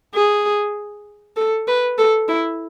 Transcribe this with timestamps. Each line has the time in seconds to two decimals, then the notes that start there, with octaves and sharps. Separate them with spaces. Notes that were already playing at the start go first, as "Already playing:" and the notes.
0.14 G#4
1.36 A4
1.68 B4
1.98 A4
2.28 E4